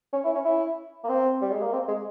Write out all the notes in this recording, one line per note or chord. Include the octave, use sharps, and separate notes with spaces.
C#4
E4
C#4
E4
A#3
C4
G3
G#3
A#3
C4
G#3